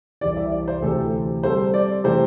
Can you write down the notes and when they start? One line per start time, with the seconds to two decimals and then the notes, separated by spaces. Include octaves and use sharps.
0.21 C2 C3 E3 C4 G4 D5
0.36 E5
0.52 D5
0.68 C5
0.82 D2 C3 E3 C4 G4 A4
1.43 G3 C4 A4 C5
1.74 D5
2.04 C3 E3 A3 C4 C5